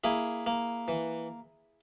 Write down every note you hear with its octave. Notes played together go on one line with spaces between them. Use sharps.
A#3 E4 G#4
A#3
E3